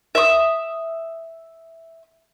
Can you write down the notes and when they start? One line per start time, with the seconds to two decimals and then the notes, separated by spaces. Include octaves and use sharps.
0.15 E5 D#6